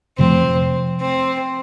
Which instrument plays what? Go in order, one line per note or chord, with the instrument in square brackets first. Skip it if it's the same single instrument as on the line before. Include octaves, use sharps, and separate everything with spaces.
[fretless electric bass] F2 C3 F3 A3 [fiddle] C4
[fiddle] C4